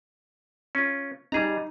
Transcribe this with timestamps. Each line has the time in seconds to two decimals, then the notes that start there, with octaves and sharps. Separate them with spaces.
0.75 C#4 F4
1.32 G3 D#4 G#4 A#5